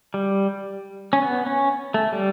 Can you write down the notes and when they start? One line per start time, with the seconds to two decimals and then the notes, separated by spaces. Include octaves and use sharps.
0.14 G3
1.13 C#4
1.22 B3
1.46 C#4
1.94 A3
2.12 G3